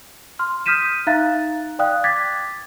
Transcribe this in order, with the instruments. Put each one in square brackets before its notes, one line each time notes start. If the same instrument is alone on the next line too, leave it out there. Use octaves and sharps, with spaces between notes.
[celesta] C6 F6
D#6 F6 G6 B6 D#7 E7
D#4 E5 F5 A#5 F#6 A6
D5 F5 G5 D#6 F#6
D6 G#6 A6 B6